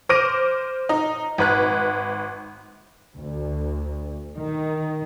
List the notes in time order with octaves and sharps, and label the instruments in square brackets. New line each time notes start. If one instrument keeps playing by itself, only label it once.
[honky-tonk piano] C5 D6 F6 A#6 D7 D#7
D#4
G#1 B4 F#6
[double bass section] D2
D#3